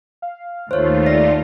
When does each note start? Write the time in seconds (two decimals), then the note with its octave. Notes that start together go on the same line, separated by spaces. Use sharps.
0.22 F5
0.71 D#2 A3 F4 C5 C#5
1.06 D5 A#6